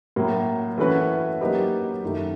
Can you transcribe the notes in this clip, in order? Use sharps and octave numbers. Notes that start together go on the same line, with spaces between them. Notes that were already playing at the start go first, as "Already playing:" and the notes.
A2 F#3 A#3
E3 A3 C#4 F#4 B4
F#3 A#3 D#4 G4 B4
F#2 D#3 F#3 A3